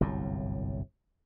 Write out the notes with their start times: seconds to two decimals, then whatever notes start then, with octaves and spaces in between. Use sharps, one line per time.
0.01 G1 C2 F#2 A2